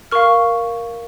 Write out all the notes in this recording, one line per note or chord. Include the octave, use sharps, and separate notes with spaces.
A#4 F5 C#6 F6